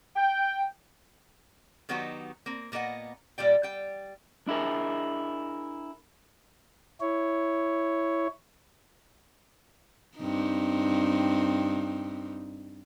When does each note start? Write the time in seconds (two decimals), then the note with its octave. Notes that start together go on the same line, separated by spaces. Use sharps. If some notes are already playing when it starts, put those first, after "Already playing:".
0.16 G5
1.89 D#3 F#3 B3 D#4 F#4 G4
2.46 A#3 C4
2.72 A#2 A#3 B3 D#5 F#5
3.38 A#2 G3 D5 G5
3.63 G3 G5
4.48 D4 E4 G#4 A#4
7.01 E4 C#5
10.18 G2 C4 D#4